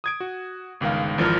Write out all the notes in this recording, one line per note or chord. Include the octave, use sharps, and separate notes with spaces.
D#6 G#6 D7
F#4
G1 C#2 D#3 A#4 F5
G#1 F2 E3 F3 A#4 F6